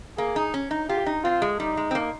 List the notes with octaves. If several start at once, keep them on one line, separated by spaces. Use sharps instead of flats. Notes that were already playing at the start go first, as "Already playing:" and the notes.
A#3 G#4
D#4
C#4
D#4
F4 G4
D#4
C4 F4
G#3
G3 D#4
G#3
C4
A#3